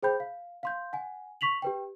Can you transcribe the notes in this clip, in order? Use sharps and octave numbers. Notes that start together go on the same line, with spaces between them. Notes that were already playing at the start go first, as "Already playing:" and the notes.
G#4 C5 G5 B5 G6
F5
F5 C6 G6
F#5 G#5
C#6 B6 F7 F#7
G4 B4 G5